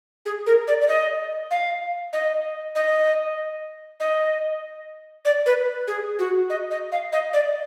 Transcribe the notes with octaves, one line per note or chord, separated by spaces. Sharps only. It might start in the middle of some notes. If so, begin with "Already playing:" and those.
G#4
A#4
D5
D5
D#5
F5
D#5
D#5
D#5
D5
B4
G#4
F#4
D#5
D#5
F5
D#5
D5